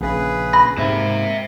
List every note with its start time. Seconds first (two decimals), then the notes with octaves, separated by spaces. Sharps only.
0.01 A#1 C#3 G#4 B4
0.53 B5 A#6
0.78 G#2 C3 A#3 C5 E5